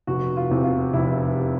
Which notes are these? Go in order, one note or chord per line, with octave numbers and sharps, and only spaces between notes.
F1 F#4
F4
E2 C3 E3
F4
F1 E4